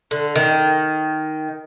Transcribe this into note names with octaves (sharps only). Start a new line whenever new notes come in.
D3
D#3